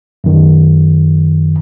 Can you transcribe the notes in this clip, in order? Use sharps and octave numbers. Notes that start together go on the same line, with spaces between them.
F#2 D#3